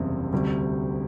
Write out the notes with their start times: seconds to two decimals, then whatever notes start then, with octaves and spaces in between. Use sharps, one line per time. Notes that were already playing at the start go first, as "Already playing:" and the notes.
Already playing: F#1 E2 C3 G3
0.33 D2 C3 G3